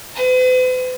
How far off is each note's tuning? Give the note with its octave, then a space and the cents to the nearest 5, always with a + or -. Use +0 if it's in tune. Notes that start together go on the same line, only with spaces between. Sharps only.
B4 +45